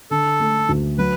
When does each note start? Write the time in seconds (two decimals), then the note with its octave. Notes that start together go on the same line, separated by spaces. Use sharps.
0.11 D3 A4
0.40 A3
0.69 D2
0.98 F#3 B4